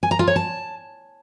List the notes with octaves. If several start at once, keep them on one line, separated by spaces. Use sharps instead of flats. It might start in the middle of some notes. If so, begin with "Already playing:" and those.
G#5
A#5
F4
C#5
A5